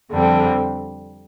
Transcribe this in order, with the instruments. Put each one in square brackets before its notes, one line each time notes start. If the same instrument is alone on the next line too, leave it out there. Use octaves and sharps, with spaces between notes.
[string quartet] F2 D3 G3 C4